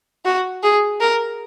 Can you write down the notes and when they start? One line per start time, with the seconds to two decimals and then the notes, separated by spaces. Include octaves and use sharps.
0.25 F#4
0.63 G#4
1.00 A#4